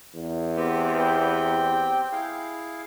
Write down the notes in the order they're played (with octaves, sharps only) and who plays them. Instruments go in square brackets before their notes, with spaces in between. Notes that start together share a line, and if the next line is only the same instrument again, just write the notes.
[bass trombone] E2
[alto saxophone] B3 [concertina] C4 G4
[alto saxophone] G5
[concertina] E4 G#4 F5